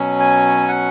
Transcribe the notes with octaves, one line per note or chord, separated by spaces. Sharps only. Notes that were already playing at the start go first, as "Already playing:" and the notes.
Already playing: B2 F#3 C#4
G#5
F#5